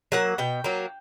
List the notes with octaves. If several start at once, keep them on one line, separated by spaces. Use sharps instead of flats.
F#3 A#3 F#5
B2 G5
F#3 A#3